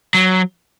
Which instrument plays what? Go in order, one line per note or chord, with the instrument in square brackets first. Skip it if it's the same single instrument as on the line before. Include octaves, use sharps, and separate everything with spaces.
[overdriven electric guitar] F#3